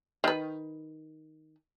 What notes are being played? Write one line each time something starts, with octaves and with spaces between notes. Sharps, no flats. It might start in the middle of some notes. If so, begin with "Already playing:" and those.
D#3 B4